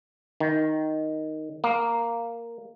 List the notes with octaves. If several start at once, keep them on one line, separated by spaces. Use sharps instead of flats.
D#3
A#3